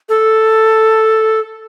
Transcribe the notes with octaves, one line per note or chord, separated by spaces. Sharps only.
A4